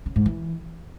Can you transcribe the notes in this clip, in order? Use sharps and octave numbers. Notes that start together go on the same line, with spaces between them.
C#3
G#2
E3